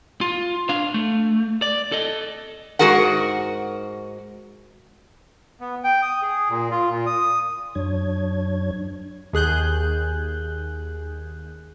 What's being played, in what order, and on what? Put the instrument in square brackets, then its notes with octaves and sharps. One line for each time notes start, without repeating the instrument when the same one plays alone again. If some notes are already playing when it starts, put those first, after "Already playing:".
[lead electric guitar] F4
D4 F5
A3
D5
A4 D#5
[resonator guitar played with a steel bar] G#2 F#4 G#4 A#4 F#5
[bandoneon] B3
G5
D#6
G#4
A#2
F4
A#2
D#6
[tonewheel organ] F#2 F#3 D4 C#5 G#6
[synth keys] D#2 G#4 F#6 G6